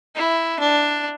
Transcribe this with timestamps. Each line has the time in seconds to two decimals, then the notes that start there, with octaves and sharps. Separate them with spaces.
0.16 E4
0.60 D4